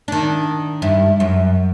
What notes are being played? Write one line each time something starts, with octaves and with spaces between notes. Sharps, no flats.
D#3 D4
G2 E4
F#2